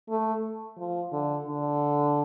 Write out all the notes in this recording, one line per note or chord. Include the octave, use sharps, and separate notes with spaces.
A3
F3
D3
D3